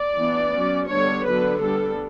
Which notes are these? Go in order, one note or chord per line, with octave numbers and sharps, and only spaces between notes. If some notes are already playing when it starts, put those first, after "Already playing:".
Already playing: D5
E3 B3 D4
F#3 C#4
D3 G3 B3 D4 C#5
D3 F#3 B3 D4 B4
G3 B3 D4 A4